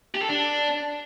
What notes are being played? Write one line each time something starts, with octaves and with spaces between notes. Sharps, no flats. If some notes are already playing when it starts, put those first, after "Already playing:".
G4
A4
D4